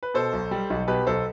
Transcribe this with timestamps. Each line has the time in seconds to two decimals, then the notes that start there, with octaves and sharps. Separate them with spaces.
0.03 B4
0.14 B2 A4 C5
0.33 B1
0.51 G3
0.70 B1
0.88 B2 G4 B4
1.06 B1 A4 C5